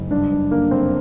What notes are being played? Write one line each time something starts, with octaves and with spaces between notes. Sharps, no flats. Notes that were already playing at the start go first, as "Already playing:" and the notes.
Already playing: F#1
G2 D4
G2
D3 A#3
G1 C4